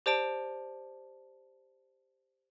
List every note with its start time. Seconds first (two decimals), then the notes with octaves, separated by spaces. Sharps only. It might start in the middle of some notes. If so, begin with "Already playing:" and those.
0.06 G4 C5 D5 A5 D7